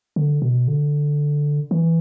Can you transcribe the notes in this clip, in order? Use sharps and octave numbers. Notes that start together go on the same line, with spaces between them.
D3
B2
D3
E3